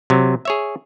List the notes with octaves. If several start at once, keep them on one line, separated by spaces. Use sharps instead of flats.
C3 F#3
G#4 C#5 E5